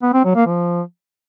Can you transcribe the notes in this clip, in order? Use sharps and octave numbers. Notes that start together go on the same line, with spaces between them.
B3
C4
F#3
A#3
F3